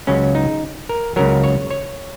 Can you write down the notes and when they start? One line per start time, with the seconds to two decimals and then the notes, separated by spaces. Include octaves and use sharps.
0.07 C#2 C#3 F#3 C#4
0.35 D#4
0.89 A#4
1.16 C#2 C#3 F#3 A#4
1.44 C#5
1.71 C#5